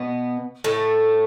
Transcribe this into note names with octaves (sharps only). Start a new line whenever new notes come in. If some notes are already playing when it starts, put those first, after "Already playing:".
Already playing: B2 B3
A2 A3